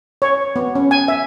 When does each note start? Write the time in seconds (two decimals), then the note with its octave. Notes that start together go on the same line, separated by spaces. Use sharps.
0.22 C#5
0.56 B3
0.75 C#4
0.91 G#5
1.08 E5